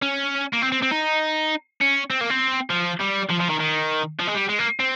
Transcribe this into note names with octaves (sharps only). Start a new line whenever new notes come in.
C#4
A#3
C4
C4
C4
D#4
C#4
C4
A#3
C4
F3
G3
F3
F3
D#3
D#3
F3
G#3
G3
G#3
A#3
C4